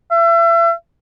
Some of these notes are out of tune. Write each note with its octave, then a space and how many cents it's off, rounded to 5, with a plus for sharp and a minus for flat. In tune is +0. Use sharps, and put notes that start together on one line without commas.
E5 +35